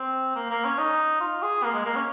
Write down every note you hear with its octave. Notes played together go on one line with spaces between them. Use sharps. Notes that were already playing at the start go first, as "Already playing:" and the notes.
Already playing: C4
A#3
A#3
C#4
D#4
F4
G#4
A#3
G#3
A#3
C#4